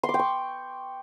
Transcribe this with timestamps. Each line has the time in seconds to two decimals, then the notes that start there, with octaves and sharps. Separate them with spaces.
0.03 C6
0.09 D6
0.14 G5
0.19 C#6